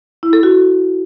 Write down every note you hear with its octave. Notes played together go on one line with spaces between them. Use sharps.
E4
A4
F#4